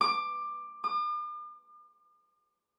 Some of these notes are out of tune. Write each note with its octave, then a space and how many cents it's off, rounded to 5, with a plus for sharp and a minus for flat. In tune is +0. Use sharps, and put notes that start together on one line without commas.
D6 +15
D6 +45